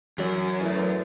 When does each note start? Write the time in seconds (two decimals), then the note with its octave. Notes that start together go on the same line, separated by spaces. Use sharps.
0.18 F#2 E3 F#4 C#5
0.61 E2 A3